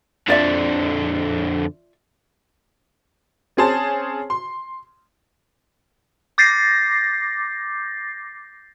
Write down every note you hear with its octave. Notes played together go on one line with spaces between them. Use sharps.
F2 D3 F4 D5 E5
C4 C#4 G#4 C5 A5
C6
D6 G6 A6 A#6 C7